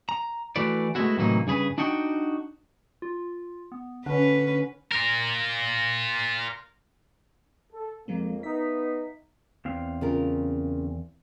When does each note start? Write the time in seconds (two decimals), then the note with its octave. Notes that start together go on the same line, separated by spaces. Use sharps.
0.09 A#5
0.56 E3 A3 F#4 B4 D5
0.95 G#3 A3 B3 C#4 E4 F#4
1.17 A2 C3 E3 F#3 A#3 D#4
1.47 G2 C#3 G#4 B4
1.78 D4 D#4 F#4 F#5 G5
3.02 F4
3.72 B3
4.06 D3 C#4 D4 B4 F#5
4.92 F4 A#4
7.73 A4
8.08 F2 F3 G#3 A#3 C4
8.43 B3 D#4 E5 B6
9.65 E2 C4 F5
10.01 C#3 F4 A#4